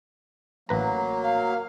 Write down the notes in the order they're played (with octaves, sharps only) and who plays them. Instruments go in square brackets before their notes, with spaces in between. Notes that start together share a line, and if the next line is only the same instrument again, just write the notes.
[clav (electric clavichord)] A1 B4 A#5 [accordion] F#3 A#3
[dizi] F5